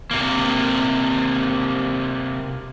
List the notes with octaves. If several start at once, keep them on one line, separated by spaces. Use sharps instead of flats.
C3 A#3